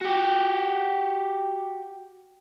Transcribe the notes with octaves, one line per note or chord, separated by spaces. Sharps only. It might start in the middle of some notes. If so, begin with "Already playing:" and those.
F#4 G4